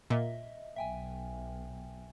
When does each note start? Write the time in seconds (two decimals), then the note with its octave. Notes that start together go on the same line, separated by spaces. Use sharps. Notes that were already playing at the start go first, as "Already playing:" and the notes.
0.10 A#2 D#5 E5
0.76 B1 E5 G5 G#5